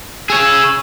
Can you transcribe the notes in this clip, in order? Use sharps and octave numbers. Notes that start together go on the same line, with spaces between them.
G#4 C#5 E6